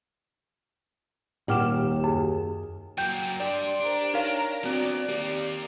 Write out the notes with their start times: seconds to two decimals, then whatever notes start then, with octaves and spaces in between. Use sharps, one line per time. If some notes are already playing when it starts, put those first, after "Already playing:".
1.48 D#1 D#2 F#5 G5 D6 F6 E7
2.04 F#2 G#4
2.98 F#3 A#3 G5 G6
3.40 D4 G4 D5 C6
3.80 D4 G4 A#4 C5
4.14 D#4 A#4 C#5 F5 A#5 F7
4.64 B3 C4 D4 F#4 D5
5.09 D#3 A#3 G4